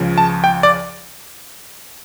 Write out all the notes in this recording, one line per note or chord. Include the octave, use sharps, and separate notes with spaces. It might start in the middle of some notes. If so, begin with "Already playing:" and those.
Already playing: C#2 C#3 F3
A5
G5
D5